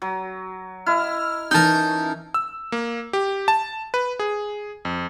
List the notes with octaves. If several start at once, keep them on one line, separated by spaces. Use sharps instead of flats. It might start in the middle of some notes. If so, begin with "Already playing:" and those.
F#3
E4 D#5 F6
E3 C#4 D#4 A#4 A5 G6
E6
A#3
G4
A5
B4
G#4
F2